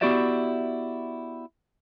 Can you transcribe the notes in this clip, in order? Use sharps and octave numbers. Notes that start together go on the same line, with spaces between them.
B3 E4 F#4 G4 D5 E5